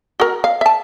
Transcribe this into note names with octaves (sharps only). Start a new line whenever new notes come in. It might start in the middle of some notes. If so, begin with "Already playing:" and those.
F#4 A#4
F5
E5 A5